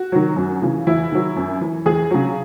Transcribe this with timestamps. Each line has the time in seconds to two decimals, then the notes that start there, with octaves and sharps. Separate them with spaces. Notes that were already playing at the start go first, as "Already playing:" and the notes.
Already playing: F#4
0.12 D#3 F#3
0.36 F#2
0.62 C#3 E3
0.87 E2 E4
1.12 D#3 F#3
1.36 F#2
1.61 E3
1.86 E2 G#4
2.11 C#3 F#3